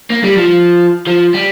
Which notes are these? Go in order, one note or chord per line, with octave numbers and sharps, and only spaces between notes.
A#3
G3
F3
F3
G3